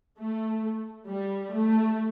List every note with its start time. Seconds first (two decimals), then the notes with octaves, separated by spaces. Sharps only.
0.19 A3
1.07 G3
1.52 A3